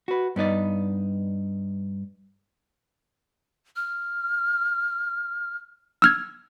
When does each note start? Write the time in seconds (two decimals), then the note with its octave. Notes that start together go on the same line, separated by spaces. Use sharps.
0.08 F#4 B4
0.36 G2 B3 D#4 D5
3.76 F6
6.02 E6 F6 G#6